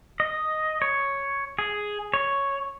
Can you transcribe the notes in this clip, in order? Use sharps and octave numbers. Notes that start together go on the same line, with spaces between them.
D#5
C#5
G#4
C#5